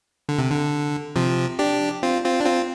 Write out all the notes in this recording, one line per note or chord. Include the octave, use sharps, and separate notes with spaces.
D3
C3
D3
C3 F3
D4 G4
C4 F4
C4 F4
D4
C4 F4